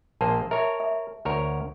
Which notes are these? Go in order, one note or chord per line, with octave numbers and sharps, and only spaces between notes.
A#1 A#3 C5 A5
A#4 C#5 E5
E5
D2 A#4 C#5